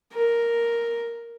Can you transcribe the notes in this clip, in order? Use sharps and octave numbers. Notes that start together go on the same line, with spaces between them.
A#4